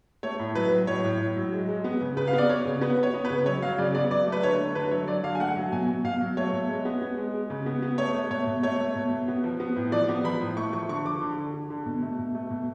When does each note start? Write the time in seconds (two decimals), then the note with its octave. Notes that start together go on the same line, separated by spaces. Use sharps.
0.23 A3 C#5
0.39 A2
0.55 F#3 B4
0.71 F#3
0.87 A2 C#5
1.04 A2
1.20 A2
1.36 F#3
1.52 G#3
1.68 G#3
1.84 B3
2.01 C#3
2.17 C#3 B4
2.28 F5
2.33 B3
2.38 D5
2.49 B3 C#5
2.65 C#3
2.81 B3 B4
2.97 B3
3.03 C#5
3.14 B3
3.25 B4
3.30 C#3
3.46 F#3 C#5
3.62 F#3 F5
3.78 C#3 D5
3.95 B3 D5
4.10 F#3 D5
4.27 A3
4.32 B4
4.43 D3 C#5
4.59 A3
4.75 D3 B4
4.91 F#3 C#5
5.07 F#3 D5
5.24 D3 F5
5.35 G#5
5.40 A3 F#5
5.56 F#3
5.72 B2 G#5
5.88 B2
6.04 B2 F5
6.21 F#3
6.37 A3 C#5
6.53 B2
6.69 G#3
6.85 B3
7.01 B3
7.17 G#3
7.34 G#3
7.50 C#3
7.66 B3
7.82 B3
7.98 A3 C#5
8.14 A3
8.30 B2 C#5
8.47 B2
8.63 A3 C#5
8.80 A3
8.95 B2
9.11 B2
9.28 B3
9.44 F3
9.60 B3
9.76 A2
9.92 F3 D5
10.08 B3
10.24 F3 B5
10.41 A2
10.57 A3 C#6
10.73 F3 C#6
10.89 D3 C#6
11.05 F3 D6
11.21 D3
11.38 D3
11.54 D3
11.70 D3
11.86 B2
12.02 A3
12.19 B2
12.35 A3
12.51 B2